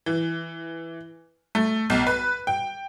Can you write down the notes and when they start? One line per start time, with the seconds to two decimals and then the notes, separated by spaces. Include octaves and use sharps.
0.06 E3
1.55 A3
1.90 B1
2.07 B4
2.47 G5